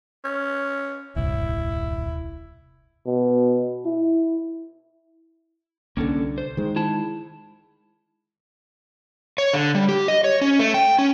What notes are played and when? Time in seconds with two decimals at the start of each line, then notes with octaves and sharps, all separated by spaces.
0.24 C#4
1.16 D#1 C2 G2 E4
3.06 B2
3.85 E4
5.97 C2 D3 A#3 C#4 A4
6.38 C5
6.57 D#3 G#3
6.76 E4 A5
9.38 C#5
9.54 D3
9.75 G3
9.88 G4
10.08 D#5
10.24 C#5
10.41 C#4
10.59 A3
10.74 G5
10.99 C#4